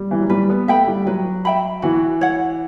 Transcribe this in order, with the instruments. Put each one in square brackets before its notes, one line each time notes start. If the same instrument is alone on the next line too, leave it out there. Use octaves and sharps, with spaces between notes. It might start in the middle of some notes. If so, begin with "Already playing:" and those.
Already playing: [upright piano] G3
E3
F#3
[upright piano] G3 [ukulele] B4
[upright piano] B3
[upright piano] A3 [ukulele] E5 G5 B5
[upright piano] G3
[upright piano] F#3 [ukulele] B4
[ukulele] E5 G5 B5
[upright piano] E3 [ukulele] F#4
[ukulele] C#5 F#5